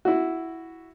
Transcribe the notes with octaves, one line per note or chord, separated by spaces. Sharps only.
E4 F#4